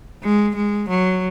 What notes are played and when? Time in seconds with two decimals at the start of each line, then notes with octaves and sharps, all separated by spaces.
0.23 G#3
0.56 G#3
0.89 F#3